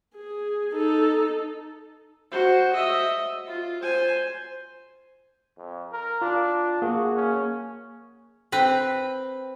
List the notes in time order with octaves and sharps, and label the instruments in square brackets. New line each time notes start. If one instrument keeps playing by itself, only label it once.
[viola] G#4
D#4 A4
[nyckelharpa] F#4 C5
D#5 E5
F4
C5 G#5
[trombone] F2
A#4
[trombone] D4 [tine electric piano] F4
[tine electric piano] A#3 G#4 [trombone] F#4
[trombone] C#4
[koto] C4 B4